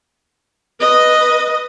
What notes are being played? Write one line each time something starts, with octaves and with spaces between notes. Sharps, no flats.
B4 D#5